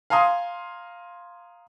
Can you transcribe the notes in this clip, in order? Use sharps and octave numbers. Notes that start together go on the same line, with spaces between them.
F5 G#5 A#5 C6 D#6